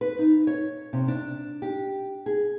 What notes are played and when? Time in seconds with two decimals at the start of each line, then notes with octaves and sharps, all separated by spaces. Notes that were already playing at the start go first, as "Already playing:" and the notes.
0.01 B4
0.19 D#4
0.47 C#5
0.93 C3
1.08 D4
1.62 G4
2.26 G#4